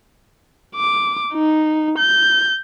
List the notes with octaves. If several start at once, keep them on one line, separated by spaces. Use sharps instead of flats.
D6
D#4
G6